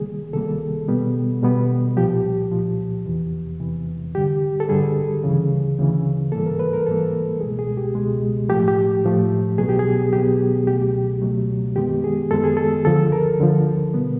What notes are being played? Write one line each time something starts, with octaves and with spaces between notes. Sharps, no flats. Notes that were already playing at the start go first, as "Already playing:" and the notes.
Already playing: C2 C3 D#3 G3 A#3 G#4
C2 C3 D#3 G3 A#3 A4
B2 G3 B3
B2 G3 B3
C2 A#2 F3 G4
C2 A#2 F3
E2 C3 E3
E2 C3 E3
G2 D3 G3 G4
A4
G2 D3 G3 G#4
D2 C#3 E3
D2 C#3 E3
G#2 E3 G3 A#3 A4
A#4
B4
A#4
G#2 E3 G3 A#3 A4
C#2 B2 G#3 G#4
G#4
G4
C#2 B2 G#3
A2 F3 A3 G4
G4
A2 F3 A3
C2 B2 F#3 B3 G#4
G4
G#4
C2 B2 F#3 B3 G4
C#2 B2 F#3 A3 G4
G4
C#2 B2 F#3 A3
F#2 D#3 G#3 B3 G4
G#4
F#2 D#3 G#3 B3 A4
G#4
A4
D2 D3 F3 A4
A#4
D2 D3 F3
B2 G3 B3